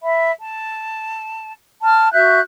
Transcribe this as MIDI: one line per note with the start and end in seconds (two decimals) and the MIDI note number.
0.02 0.31 76
0.02 0.31 83
0.40 1.53 81
1.81 2.12 81
1.81 2.12 89
2.12 2.40 66
2.12 2.40 76
2.12 2.40 90
2.12 2.40 91